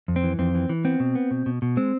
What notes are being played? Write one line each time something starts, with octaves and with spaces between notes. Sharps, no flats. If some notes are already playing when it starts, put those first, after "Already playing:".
F2
C4
E3
F2 C4
E3
E3
B3 C4
B2
B3
B2
B2
B2
G#3 C4